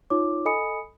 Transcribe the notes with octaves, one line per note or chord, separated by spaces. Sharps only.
D#4 F4 C#5 D6
A4 D#5 G#5 B5 D#6 C#7